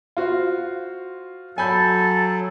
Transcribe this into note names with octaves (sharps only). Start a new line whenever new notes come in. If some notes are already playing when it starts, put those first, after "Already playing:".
F4 F#4 C5
F#3 A4 G#5 B5 G6